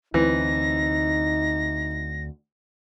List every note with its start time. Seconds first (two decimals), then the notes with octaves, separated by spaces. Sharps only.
0.14 D2 E3 C4 D#4 A#6